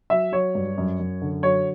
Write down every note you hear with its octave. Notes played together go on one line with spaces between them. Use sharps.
F#3 E5
F#3 C#5
G2
F#2
F#2
D3
F#3 C#5